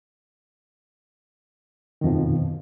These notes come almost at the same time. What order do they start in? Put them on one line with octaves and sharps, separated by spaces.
D#3 F2 F3 B2